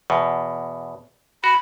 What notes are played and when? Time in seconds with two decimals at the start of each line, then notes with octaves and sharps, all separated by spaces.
0.10 E2 B2
1.44 F#4 B5